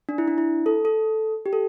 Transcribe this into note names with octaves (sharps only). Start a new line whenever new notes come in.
D4
E4
D4
E4
A4
A4
G4
A4